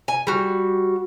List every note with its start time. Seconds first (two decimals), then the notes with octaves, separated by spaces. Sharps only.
0.08 G#5
0.27 G3 F#4